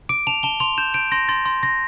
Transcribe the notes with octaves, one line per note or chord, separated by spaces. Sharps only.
D6 D7
A5 F7
A5 G7
C6 F7
G6 E7
G6 D7
C6 A#6
C6 A6
C6
C6 A#6